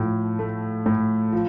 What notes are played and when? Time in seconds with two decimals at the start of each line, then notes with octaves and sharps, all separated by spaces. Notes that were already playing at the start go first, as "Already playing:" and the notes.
Already playing: A2 F3
0.39 A3
0.86 A2
1.32 F3